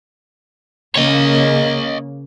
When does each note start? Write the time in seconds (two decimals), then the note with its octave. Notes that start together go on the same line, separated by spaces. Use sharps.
0.95 C#3 A#3 C#5 D#5